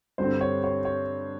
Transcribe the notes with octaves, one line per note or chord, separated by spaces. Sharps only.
G2 D3 G3 C4 C5
C#5
C#5
C#5